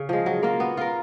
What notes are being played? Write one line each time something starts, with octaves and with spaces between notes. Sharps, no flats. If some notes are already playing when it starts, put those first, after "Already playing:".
Already playing: C#3
F3 G#3
F#3
A#3 F4
B3
F4 A#4